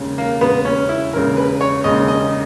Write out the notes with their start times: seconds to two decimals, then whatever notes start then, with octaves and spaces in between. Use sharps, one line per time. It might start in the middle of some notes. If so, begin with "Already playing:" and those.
Already playing: E1 D#2 C#3
0.18 A#3
0.41 E1 D#2 C#3 B3
0.65 C#4
0.89 E4
1.13 E1 D#2 C#3 A#4
1.37 B4
1.61 C#5
1.84 E1 D#2 C#3 D#5
2.08 D#5